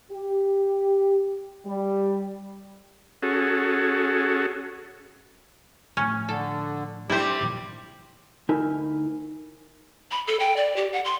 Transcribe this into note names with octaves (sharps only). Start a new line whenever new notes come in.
G4
G3
C#4 F#4 G#4 A4
A2 F3 C#4
D3 A4
G3 C4 D4 E4 G4 C5
A#2 F3
D2 D#4 E4 A#4 G#5
B5
A4
G5
D5
G4
F#5
C6